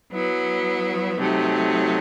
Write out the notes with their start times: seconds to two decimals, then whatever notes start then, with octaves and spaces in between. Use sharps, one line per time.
0.12 F#3 B3 E4
1.18 C3 F#3 A3 D#4